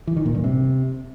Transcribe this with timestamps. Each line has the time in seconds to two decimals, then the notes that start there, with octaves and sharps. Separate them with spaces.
0.07 E3
0.17 D#3
0.26 A#2
0.35 G2
0.44 C3